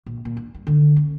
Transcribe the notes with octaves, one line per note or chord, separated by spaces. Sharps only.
A#1
A#2
D4
G2
D3 D#3
C#4